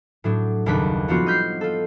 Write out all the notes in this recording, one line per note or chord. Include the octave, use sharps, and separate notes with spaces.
A2 F#3 D4
F#1 D#2 G3 D4 B4 B6
F3 B3 C4 D4 F4 F#4
D#5 F6 G6 B6 C7
F4 A4